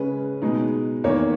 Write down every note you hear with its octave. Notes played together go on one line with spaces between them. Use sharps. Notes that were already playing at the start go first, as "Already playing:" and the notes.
Already playing: C#3 G#3 C#4 B4
B2 G#3 D#4
E2 D#3 A#3 C#5